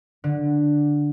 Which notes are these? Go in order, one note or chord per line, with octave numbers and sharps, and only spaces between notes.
D3